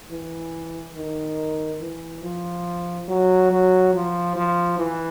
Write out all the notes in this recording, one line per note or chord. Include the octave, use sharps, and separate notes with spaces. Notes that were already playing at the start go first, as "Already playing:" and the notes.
E3
D#3
E3
F3
F#3
F#3
F3
F3
E3